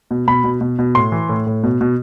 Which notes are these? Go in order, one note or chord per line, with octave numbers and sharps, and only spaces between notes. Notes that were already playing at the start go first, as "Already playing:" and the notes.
B2
B2 B5
B2
B2
B2
A2 C6
E3
A2
A2
B2
B2